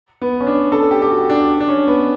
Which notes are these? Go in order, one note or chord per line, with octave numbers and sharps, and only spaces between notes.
B3
C#4
D4
A4
G4
G4
F#4
D4
D4
C#4
B3